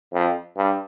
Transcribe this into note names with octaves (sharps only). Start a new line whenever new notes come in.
F2
G2